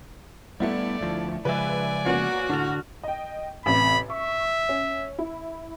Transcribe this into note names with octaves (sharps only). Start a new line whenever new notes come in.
G3 A3 B3 E4 D5
D2 F3
C#3 F3 G#3 B4 D5 E5 G#5
A#3 B3 C#4 F#4
A2 D3 D4 F6 F7
D#5 G5
A1 C3 B5
E5 C#6
C#4
E4